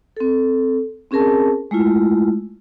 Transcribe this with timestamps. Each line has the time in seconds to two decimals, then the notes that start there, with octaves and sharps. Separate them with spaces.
0.17 C4 A4
1.11 C4 C#4 G#4 A#4 A5
1.71 G#3 A3 E4 F4